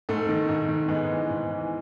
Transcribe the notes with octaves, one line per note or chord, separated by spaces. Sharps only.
G#2 A3
D#3
G#2
D#3
G#2 G#3 B3
E3
G#2
E3